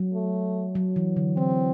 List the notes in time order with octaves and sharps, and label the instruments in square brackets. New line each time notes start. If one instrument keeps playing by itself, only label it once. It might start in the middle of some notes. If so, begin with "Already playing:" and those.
Already playing: [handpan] F#3
[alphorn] A3
[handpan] F#3
E3
D3
[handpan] E3 [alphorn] C4